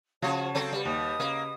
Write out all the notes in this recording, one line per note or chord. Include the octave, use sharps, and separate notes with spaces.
C#3 F3 F#4 C#5 A5
F#3 C4 A4
G3 G4 B4
D#2 B4 D#5 D#6
C#3 A#3